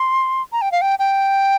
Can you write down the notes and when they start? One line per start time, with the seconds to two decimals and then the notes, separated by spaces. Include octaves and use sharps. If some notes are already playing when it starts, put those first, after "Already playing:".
Already playing: C6
0.52 A#5
0.62 G5
0.72 F5
0.82 G5
0.99 G5